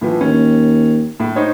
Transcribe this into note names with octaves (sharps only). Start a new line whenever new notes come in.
A2 E3 F3
D#2 C#4
A2
D#4 C5 C#5